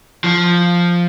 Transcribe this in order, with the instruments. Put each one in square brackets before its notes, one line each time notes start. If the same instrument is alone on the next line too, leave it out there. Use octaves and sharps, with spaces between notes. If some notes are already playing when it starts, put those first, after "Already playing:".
[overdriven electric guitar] F3